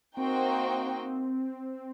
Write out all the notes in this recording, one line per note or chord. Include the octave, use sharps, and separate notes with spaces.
A#3 C4 D#4 F#4 C5 G5